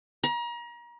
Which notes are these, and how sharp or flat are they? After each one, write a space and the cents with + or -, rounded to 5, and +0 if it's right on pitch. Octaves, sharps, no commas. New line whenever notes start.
A#5 +35